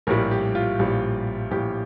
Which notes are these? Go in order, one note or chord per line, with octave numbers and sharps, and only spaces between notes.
A#1 A2 G3 A#4
G4
F4
A#1 A2 G3
A#1 A2 G3 G4